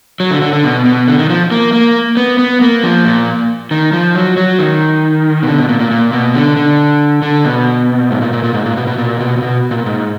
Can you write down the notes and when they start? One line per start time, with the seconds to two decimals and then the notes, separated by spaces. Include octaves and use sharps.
0.20 F#3
0.31 D3
0.42 D3
0.53 D3
0.64 B2
0.85 B2
1.08 D3
1.19 D#3
1.30 F3
1.51 A#3
1.73 A#3
2.17 B3
2.39 B3
2.61 A#3
2.83 F3
3.05 A#2
3.71 D#3
3.93 F3
4.15 F#3
4.37 F#3
4.59 D#3
5.43 B2
5.47 D3
5.58 B2
5.69 A#2
5.80 A#2
5.91 A#2
6.13 B2
6.34 D3
6.57 D3
7.22 D3
7.45 B2
8.11 G#2
8.22 A#2
8.33 A#2
8.44 A#2
8.54 G#2
8.66 A#2
8.77 B2
8.87 B2
8.98 A#2
9.20 B2
9.37 A#2
9.42 B2
9.71 A#2
9.86 G#2